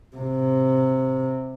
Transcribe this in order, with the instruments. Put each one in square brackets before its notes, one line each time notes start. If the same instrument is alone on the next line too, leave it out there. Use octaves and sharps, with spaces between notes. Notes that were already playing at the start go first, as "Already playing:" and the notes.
[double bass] C3